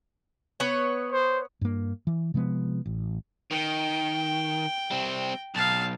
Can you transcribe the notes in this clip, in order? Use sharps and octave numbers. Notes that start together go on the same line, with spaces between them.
B3 C#5
C5
G2 A#3
E3
C3 F3 G#3 B3
A1
D#3 G5
G3 C4
B1 F5 A5